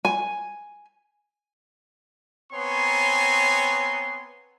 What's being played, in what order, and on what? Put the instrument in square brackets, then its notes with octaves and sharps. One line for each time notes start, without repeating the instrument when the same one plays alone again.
[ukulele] G#5
[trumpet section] B3 C4 C#5 G#5 A#5 C6